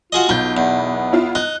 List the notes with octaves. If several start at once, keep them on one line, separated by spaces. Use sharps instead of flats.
F4 F#4 G#4 D#5
B1 B3 F4 G6
E2
E4 F4
D#4 F#6